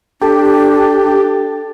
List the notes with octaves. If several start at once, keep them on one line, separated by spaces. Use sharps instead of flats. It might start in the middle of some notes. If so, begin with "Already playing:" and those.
D4 G4 A4